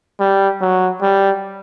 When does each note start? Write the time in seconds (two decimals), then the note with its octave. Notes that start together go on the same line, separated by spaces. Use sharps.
0.20 G3
0.62 F#3
1.02 G3